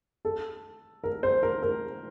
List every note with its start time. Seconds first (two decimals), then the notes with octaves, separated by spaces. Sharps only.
0.25 A4
1.04 A#4
1.23 C5
1.43 A#4
1.63 A#4